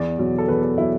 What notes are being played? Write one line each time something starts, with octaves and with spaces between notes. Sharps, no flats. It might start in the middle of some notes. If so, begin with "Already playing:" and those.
Already playing: E2 D5
B2 F#3
A4
E2 B4
A4
B2 F#3 E4